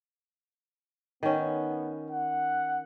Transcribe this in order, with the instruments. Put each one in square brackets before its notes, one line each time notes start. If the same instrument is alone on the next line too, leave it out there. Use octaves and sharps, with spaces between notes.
[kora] D#3 C#4 [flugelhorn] B3
[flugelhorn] F#5